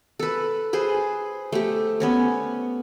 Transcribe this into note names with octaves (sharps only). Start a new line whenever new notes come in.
A4 B4
G#4 B4 C5
A3 G4
B3 C#4 C#5